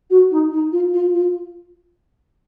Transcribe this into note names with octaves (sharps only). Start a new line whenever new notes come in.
F#4
D#4
D#4
F4
F4
F4